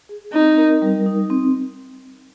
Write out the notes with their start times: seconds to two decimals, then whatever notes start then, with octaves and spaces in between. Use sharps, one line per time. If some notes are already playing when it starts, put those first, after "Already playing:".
0.09 G#4
0.33 C4 D#4
0.58 A#4
0.82 G3
1.06 D#4
1.30 C4